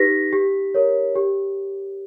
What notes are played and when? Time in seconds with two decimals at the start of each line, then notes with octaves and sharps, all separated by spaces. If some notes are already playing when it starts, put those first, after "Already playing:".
Already playing: D#4 G4 B4 A#6 B6
0.33 G4
0.74 A#4 C#5
1.16 G4